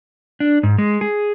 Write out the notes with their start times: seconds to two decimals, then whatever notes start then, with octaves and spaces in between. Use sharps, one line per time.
0.40 D4
0.63 G#2
0.78 G#3
1.01 G#4